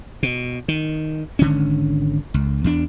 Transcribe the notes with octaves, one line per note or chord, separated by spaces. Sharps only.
B2
D#3
G#1 D3 C#4
C#2
E2 D4